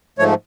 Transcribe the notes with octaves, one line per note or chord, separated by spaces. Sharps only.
G#2 F3 A3 C#5